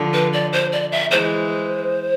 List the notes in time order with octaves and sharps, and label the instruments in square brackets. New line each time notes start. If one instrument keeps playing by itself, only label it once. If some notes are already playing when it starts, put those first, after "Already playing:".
Already playing: [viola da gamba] D3 F3
[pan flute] B4
D5
C5
D5
E5
[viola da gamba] E3 G#3 [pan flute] C5